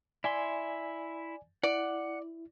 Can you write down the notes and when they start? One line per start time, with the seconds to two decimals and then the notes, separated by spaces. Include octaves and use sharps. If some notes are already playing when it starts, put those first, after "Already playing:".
0.24 E4 D5 E5 G#5 C6
1.63 E4 D5 F#5